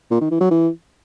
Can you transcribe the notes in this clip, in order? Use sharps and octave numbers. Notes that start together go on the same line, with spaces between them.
A#2
D#3
E3
F#3
E3